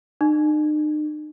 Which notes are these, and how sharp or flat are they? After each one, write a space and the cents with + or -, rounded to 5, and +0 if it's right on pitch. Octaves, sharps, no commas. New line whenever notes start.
D#4 -45